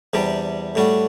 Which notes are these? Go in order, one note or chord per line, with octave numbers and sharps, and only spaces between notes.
E2 C3 G3 D4 G4
A2 G3 D4 F#4